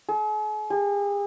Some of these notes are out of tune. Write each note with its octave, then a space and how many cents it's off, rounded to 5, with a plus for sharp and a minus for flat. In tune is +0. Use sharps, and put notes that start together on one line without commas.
G#4 +45
G#4 -45